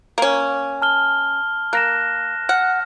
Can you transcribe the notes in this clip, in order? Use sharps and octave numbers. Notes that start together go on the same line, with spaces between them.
A#3 C#4
A5 F6 G7
A#3 F#6 A#6 E7
F#5 F6